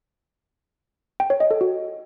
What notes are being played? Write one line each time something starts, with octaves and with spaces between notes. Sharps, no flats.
G5
C#5
D#5
A4
F#4